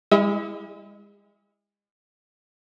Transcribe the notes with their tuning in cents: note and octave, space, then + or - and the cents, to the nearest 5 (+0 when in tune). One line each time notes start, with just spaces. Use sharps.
G#3 -35 E4 +0 E5 -45